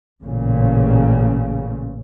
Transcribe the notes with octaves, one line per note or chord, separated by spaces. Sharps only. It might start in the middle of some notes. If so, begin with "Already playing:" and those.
A1 A#2 C#3